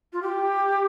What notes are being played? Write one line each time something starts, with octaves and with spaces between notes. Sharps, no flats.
F4
G4